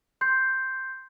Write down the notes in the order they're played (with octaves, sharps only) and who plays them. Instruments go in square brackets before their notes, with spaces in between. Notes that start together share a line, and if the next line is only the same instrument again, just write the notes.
[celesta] C6 G6 C7